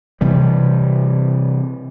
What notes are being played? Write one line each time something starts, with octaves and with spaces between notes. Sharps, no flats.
C3 E3 G3